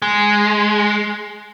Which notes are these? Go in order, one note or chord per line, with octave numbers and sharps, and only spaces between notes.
G#3